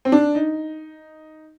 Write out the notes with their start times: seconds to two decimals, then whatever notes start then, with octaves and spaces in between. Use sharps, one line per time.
0.05 C4
0.12 D4
0.35 D#4